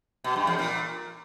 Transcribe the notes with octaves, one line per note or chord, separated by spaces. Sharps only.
B2
G2
E2
A#2